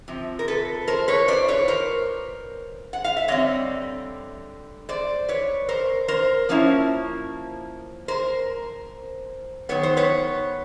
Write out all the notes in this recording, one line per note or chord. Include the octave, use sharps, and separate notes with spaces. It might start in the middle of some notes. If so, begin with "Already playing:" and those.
C3 F3
A#4
A4 B4
A#4 C5
B4 C#5
C5 D5
B4 C#5
A#4 C5
F#5
F5
E5
D3 G3 C4 C#5 D#5
C5 D5
B4 C#5
A#4 C5
A#4 C5
F3 A#3 C#4 E4
A#4 C5
D#3 F#3 B3 C#5
C5
B4 C#5